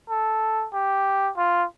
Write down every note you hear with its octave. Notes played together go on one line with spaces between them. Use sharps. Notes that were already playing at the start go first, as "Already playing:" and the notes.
A4
G4
F4